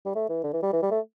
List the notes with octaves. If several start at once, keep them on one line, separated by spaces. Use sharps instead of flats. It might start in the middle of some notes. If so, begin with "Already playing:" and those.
G3
A3
E3
D3
E3
G3
E3
G3
A3